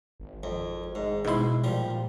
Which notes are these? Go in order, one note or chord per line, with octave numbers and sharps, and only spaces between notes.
G#1
F2
G#2
G#2 B2 E4 C6
A#2 F3 G3